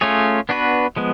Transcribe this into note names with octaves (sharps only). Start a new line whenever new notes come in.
A3 C#4 F4 G#4 C#5
B3 D4 F#4 B4
F3 G#3 B3